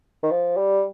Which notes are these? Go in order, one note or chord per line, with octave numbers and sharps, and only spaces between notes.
D#3
F3
G3